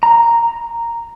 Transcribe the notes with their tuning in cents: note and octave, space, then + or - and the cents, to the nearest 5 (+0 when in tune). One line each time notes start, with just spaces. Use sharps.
A#5 -5